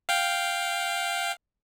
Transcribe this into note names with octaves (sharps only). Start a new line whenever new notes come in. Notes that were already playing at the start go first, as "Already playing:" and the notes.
F5 G5